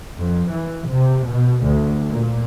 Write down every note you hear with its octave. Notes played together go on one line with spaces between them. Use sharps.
F2
E3
C3
B2
D2
A#2